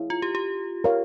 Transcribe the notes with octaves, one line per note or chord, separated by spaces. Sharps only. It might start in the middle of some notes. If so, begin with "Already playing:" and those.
Already playing: E4 G#4 C#5 F5
F4
G4
G4
A#4 C#5 F5